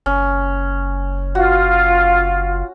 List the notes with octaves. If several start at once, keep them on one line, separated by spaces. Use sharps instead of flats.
F#1 C#4
F4 F#4